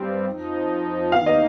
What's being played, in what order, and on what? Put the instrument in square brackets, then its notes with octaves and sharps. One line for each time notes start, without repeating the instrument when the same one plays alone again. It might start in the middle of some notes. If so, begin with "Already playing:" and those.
Already playing: [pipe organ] G2 G3 C4
F2 F3 D#4
[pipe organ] D#2 D#3 A#3 D#4 [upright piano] F5
[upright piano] D#5